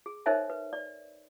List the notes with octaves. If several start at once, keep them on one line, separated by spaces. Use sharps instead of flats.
G#4
D#4 A#4 C5 C#5 E5 G#5
B4
D5